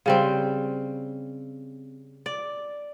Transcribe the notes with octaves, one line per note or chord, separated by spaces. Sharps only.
C#3 G3 C4
D5